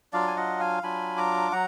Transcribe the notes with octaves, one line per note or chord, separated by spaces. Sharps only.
F#3 D4 F4 D5 F5
G#5
D#5 F#5
F5 G#5
F#3 D4 F4 G#5 B5
A#5 D6
F#3 F#5 A#5